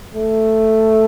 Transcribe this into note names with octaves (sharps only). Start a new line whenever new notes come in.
A3